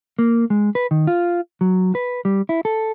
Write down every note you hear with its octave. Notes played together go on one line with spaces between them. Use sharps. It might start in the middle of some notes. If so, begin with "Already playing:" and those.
A#3
G#3
B4
D#3
F4
F#3
B4
G3
E4
A4